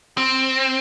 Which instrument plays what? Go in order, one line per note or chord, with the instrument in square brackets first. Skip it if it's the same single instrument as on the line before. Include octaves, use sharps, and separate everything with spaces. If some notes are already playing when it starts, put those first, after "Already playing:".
[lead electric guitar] C4